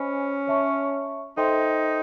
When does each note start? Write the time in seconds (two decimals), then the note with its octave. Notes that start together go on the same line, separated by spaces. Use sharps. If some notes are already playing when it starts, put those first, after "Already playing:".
Already playing: C#4 C5 D#5 G#5 B5
0.47 C#5 E5 A5 C#6
1.37 D#4 A4 C5 E5 G5 C6